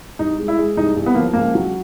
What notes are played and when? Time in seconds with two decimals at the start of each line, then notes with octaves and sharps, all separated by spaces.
0.19 C2 D#4
0.38 G#3
0.48 E4
0.58 G#3
0.77 C2 D#4
0.96 C2
1.06 B3
1.15 F3 A#3
1.33 C#2 A#3
1.55 F#3